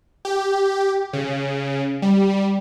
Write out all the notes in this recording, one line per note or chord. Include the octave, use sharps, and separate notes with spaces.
G4
C#3
G3